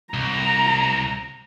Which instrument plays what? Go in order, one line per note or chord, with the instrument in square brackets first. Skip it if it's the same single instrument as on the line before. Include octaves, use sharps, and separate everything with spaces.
[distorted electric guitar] C2 [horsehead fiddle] A#5